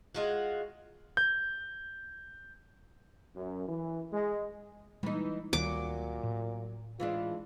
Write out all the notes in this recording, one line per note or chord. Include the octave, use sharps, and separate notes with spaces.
G#3 F4 F#4
G6
F#2
E3
G#3
E3 G3 G#3 A#3 D#4
D2 A#2 D#3 F#3 G3 D6
A2
E3 G#3 D4 F4